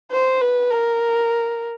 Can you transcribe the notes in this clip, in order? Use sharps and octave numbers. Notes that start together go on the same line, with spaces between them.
C5
B4
A#4